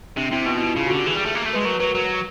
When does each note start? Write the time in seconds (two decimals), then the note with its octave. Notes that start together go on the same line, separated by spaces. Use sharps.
0.17 C3 D4
0.31 C3 E4
0.46 B2 F4
0.61 E4
0.76 C#3 F4
0.86 F#4
0.90 D3 G4
1.06 E3 G#4
1.15 G3
1.26 A3
1.35 A#3
1.46 A3
1.53 G#3 B4
1.65 F#3 A#4
1.80 F#3 B4
1.95 F#3